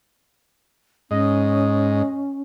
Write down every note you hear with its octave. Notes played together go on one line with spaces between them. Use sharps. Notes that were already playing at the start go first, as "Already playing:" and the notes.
G#2 C#4 D#5